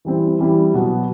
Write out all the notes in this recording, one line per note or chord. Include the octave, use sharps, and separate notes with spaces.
E3 G3 C4 E4
E3 G3 C4 E4
B2 F#3 B3 F#4